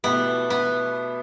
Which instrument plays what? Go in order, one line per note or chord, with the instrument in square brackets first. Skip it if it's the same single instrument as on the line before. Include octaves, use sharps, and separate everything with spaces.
[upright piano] B2 A3 E4 G4 [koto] B3
[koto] B3